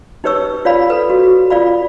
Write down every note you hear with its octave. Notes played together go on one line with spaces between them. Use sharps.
D#4 G4 B4 C#5 C#6 E6
F4 C#5 D5 F5 B5
A4 B4
F#4
F4 D5 F5 B5